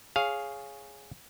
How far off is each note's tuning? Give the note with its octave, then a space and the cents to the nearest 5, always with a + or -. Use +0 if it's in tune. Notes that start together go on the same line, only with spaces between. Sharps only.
G#4 +0 C#5 +0 F5 +0